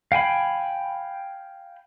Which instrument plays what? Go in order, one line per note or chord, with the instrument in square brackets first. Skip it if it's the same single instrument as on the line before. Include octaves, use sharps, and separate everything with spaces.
[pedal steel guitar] F5 G5 G#5 B5